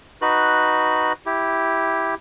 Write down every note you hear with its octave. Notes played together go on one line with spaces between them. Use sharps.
D#4 F#4 B4 F#6
E4 G4